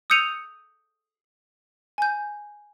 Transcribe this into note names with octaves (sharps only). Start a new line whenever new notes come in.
D#6 E6 G6 C#7 D#7 F7
G#5 G6